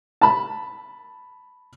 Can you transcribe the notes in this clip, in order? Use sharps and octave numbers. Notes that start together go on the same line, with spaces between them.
A5 B5